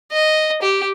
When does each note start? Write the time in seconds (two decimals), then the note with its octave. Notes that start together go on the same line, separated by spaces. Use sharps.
0.12 D#5
0.62 G4